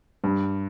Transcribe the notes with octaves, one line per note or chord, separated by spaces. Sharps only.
G2